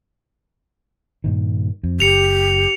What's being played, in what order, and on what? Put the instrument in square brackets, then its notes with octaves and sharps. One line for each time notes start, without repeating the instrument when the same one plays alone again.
[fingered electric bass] G2 A#2 D#3
F2
[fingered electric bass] F#1 [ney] G4 [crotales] C#7 F7